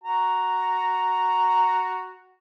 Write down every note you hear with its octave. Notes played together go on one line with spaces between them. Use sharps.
F#4 A#5